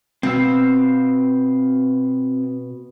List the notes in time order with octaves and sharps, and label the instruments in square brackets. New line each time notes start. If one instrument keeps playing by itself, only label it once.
[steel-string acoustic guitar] B2 [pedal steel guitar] C4 F5 E6